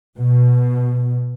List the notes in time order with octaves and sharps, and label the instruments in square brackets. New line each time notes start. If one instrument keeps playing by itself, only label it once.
[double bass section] B2